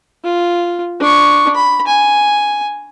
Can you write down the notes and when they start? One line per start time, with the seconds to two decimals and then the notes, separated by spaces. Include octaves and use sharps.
0.24 F4
1.00 D4 C#6
1.55 B5
1.87 G#5